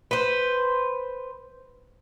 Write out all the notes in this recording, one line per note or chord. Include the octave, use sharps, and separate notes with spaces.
B4 C5